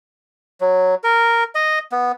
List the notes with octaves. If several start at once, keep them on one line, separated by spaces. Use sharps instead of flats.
F#3
A#4
D#5
B3